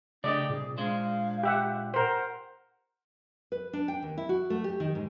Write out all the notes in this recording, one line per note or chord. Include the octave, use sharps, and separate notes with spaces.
C#3 A3 D4 G4 D5 D#5
C2 A#2 G#4
G#3 D4 C5 F5
G4 E5 F#5
A#4 C5 F#5
B4
D4
G5
D#2
E4
F#4
A3
G4
D#3
G#2